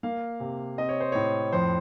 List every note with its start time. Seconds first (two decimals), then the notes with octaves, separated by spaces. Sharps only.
0.03 A#3 F5
0.40 C3
0.78 C4 D#5
0.89 C#5
1.00 C5
1.12 A2 C#5
1.52 F2 C5